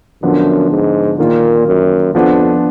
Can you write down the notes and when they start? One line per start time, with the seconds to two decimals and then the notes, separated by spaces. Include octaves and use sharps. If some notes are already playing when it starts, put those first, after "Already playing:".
0.23 F#2 D3 F3 B3 D4
0.70 G#2
1.19 A#2 D#3 A#3 F4
1.67 F#2
2.14 F2 F3 B3 D4